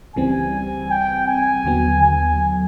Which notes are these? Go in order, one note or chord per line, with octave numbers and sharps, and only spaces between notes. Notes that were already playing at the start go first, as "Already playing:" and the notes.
C#2 C#3 E3 G3 C4 G#5
G5
G#5
D#2 D3 F#3 B3
G#5